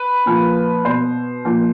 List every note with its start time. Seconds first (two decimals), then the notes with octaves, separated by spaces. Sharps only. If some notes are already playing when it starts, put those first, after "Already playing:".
Already playing: B4
0.26 A#2 F3
0.85 B2 C5
1.45 A#2 F3